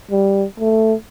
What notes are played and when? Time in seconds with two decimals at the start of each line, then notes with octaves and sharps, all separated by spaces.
0.11 G3
0.60 A3